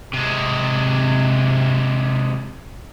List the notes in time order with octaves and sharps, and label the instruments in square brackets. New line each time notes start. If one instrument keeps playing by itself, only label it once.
[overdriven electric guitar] C3 G#3